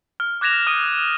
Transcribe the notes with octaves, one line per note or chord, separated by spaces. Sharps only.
F6
D6 F#6 G#6 A#6 E7 F7
D#6 F6 D#7